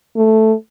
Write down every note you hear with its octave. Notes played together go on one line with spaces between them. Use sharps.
A3